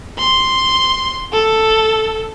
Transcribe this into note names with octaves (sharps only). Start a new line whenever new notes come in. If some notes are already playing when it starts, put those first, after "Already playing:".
C6
A4